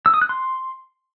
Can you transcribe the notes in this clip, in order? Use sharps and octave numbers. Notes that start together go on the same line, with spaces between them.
E6
D#6
F#6
C6